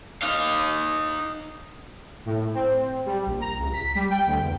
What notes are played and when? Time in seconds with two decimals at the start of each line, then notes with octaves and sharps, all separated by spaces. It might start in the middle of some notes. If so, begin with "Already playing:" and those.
0.22 D#4 F5
2.26 A2
2.54 C4
3.06 G3
3.26 A#1
3.41 A#5
3.59 C#2
3.73 B6
3.95 G3
4.10 G5
4.26 D2
4.41 E2